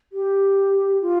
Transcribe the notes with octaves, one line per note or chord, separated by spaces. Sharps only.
G4
F4